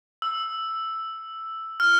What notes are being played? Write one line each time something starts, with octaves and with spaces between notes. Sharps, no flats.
E6
F6